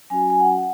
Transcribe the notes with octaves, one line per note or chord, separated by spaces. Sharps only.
F#3 C#4 F#4 G#5
G#5
F#5